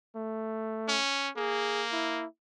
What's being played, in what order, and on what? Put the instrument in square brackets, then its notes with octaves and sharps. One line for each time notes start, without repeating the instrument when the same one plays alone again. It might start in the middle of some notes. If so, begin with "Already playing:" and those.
[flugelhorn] A3
[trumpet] C#4
[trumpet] A#3 [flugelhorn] G#4
[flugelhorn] E4